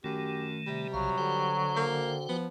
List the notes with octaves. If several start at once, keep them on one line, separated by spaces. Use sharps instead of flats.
F#2 D#3 A3 G4
C3 G3
B1 C#3 F#3 F5
D3 F#4 C5 G5
A#3
F3 B3